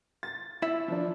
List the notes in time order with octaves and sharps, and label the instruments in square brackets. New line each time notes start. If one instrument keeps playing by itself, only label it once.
[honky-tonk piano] A6
[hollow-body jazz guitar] E4 C#5 E5
[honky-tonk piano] F3 D4